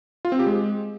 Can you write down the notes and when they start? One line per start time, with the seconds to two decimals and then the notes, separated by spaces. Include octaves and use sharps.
0.25 F4
0.32 C4
0.39 G4
0.47 G#3